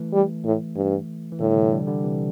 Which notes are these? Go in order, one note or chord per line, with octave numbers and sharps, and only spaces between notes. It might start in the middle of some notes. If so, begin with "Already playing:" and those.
Already playing: E3 A3
G3
A2
G2
E3
A2 D3 G3
C3 E3
D3 G3
D3 G3
C3 E3